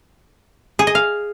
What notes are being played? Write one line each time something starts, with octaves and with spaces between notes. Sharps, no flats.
G#4
D#5
F5